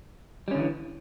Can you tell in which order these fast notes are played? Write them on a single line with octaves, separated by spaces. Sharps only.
G3 C#4 D3 E3